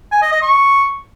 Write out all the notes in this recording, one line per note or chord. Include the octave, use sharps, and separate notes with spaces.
G#5
D#5
D#5
C#6